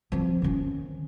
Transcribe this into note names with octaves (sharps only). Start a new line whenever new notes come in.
F3 C4
D#3 C#4